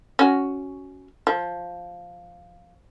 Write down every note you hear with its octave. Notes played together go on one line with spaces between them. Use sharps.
C#4 F#4
F3